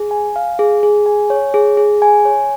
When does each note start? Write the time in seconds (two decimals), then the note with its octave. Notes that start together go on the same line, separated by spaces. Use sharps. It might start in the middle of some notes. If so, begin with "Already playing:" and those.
Already playing: G#4
0.11 G#5
0.36 F5
0.59 G#4
0.83 G#4
1.06 G#5
1.30 C#5
1.54 G#4
1.77 G#4
2.02 G#5
2.25 C#5